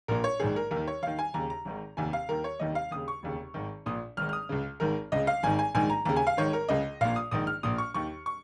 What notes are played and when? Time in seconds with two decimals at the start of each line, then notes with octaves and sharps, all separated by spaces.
0.08 A#1 A#2 A#4
0.24 C#5
0.40 A#1 G#2 D#3 G#4
0.56 A#4
0.71 D#2 A#4
0.76 D#3
0.87 C#5
1.02 D#2 D#3 F5
1.19 G#5
1.34 D#2 C#3 A#5
1.50 A#5
1.65 G#1 G#2 D#3
1.97 F1 D#2 D#3 G#5
2.13 F5
2.29 D#2 D#3 A#4
2.44 C#5
2.59 F1 D#2 D#3 D#5
2.75 F5
2.91 D#2 C#3 D#6
3.08 C#6
3.23 F1 D#2 C#3
3.54 G#1 G#2 D#3
3.86 A#1 A#2 D#6
4.17 G#1 G#2 D#3 F6
4.29 F6
4.33 D#6
4.49 C#2 C#3
4.80 G#1 G#2 D#3 A#4
5.12 C#2 C#3 D#5
5.27 F5
5.43 G#1 G#2 D#3 G#5
5.59 G#5
5.75 A#1 G#2 D#3 G#5
5.90 A#5
6.05 D#2 C#3 A#5
6.16 G#5
6.27 F5
6.37 G#1 G#2 D#3 C#5
6.53 A#4
6.68 C#2 C#3 D#5
7.01 A#1 A#2 F5
7.16 D#6
7.31 A#1 G#2 D#3 D#6
7.47 F6
7.63 A#1 A#2 D#6
7.78 C#6
7.94 D#2 D#3 C#6
8.26 C#6